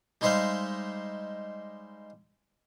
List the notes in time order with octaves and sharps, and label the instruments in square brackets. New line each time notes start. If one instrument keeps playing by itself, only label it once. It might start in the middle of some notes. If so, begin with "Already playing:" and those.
[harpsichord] G3 G#3 D#4 C5 E5 F5